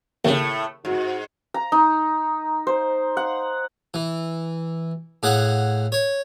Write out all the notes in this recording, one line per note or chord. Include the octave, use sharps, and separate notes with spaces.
D#2 A2 C#3 A3
G#2 F#4
A#5
D#4
C5
F#5
E3
A2 G#4 F5 F#5
C#5